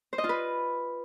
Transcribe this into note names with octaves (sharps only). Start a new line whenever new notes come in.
C5
D#5
F4
B4